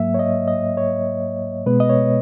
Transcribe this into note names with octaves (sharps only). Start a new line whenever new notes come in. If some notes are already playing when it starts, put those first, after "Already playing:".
Already playing: G#2 F#3 A#3 E5
C#5
D#5
D#5
C#5
B2 G#3 B3 B4
D#5
C#5